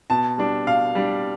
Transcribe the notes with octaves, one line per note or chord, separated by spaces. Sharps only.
B2 A5
G3 D4
B2 F5
G3 D4